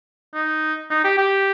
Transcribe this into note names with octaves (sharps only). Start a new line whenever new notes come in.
D#4
D#4
G4
G4